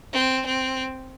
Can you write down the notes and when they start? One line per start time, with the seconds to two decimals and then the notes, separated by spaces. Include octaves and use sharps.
0.13 C4
0.46 C4